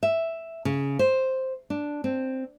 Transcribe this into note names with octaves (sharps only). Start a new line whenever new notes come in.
E5
C#3
C5
D4
C4